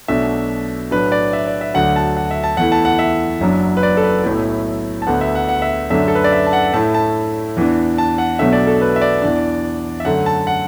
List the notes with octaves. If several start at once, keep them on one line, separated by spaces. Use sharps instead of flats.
B1 B2 A3 D4 E5
A2 F#3 D4 B4
D5
E5
D5
E5
D2 D3 F#3 D4 F#5
A5
F#5
E5
A5
E2 E3 A3 E4 F#5
A5
F#5
E5
F#1 F#2 F#3 D4
B4
D5
A4
B4
B1 A2 A3 E4
A5
D2 D3 B3 D4 F#5
E5
F#5
F#5
E5
F#2 D3 A3 D4 E5
A4
B4
D5
E5
A5
F#5
A2 A3 E4 A5
A5
E2 E3 D4
A5
F#5
B1 B2 F#3 A3 D4 E5
D5
A4
B4
E5
D5
E2 E3 D4
E5
F#2 D3 A3 F#5
A5
F#5